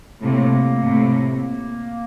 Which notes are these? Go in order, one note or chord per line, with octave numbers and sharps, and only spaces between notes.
A2 C3 A#3
A2 C3
A#3